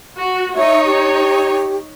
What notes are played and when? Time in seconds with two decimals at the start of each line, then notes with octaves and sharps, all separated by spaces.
0.16 F#4
0.55 D#4 C#5 E5
0.85 G4